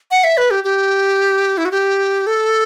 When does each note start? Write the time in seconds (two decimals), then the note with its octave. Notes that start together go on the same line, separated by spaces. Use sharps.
0.11 F#5
0.24 E5
0.37 B4
0.51 G4
0.64 G4
1.58 E4
1.65 F#4
1.72 G4
2.27 A4